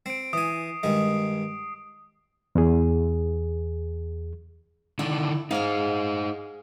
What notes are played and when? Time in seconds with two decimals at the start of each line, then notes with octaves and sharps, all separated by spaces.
0.06 C4 C7 D7
0.33 E3 G#5 D#6
0.83 G2 D#3 G#3
2.55 E2 G#4
4.99 D3 D#3 D4 E4
5.51 D#4 G#4 C5 F5